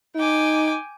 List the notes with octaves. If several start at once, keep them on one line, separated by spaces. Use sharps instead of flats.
D#4 G5 G#5 D6